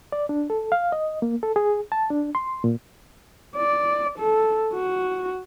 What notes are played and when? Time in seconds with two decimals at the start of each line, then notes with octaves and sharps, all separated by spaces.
0.12 D5
0.29 D4
0.50 A4
0.72 F5
0.92 D#5
1.22 A#3
1.43 A4
1.56 G#4
1.92 A5
2.10 D4
2.35 C6
2.64 A#2
3.57 D5
4.18 A4
4.74 F#4